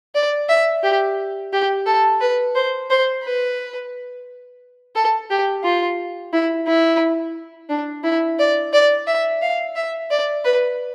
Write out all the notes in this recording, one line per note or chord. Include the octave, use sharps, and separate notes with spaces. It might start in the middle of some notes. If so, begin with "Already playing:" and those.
D5
E5
G4
G4
A4
B4
C5
C5
B4
A4
G4
F4
E4
E4
D4
E4
D5
D5
E5
F5
E5
D5
B4